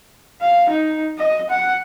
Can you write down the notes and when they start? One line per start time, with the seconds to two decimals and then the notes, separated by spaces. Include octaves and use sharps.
0.41 F5
0.69 D#4
1.18 D#5
1.50 F#5